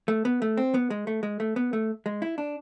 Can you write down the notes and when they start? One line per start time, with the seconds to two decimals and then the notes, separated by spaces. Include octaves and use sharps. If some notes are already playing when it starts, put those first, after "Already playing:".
0.08 A3
0.25 B3
0.42 A3
0.57 C4
0.74 B3
0.90 G#3
1.07 A3
1.23 G#3
1.40 A3
1.56 B3
1.73 A3
2.06 G#3
2.22 E4
2.38 D4